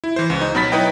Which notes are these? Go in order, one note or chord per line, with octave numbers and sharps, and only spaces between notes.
E4
E3 C5
C#2
D#4
B2 F#3 B5 A6 B6
D#4 E4 B4 C#5 D#5 G5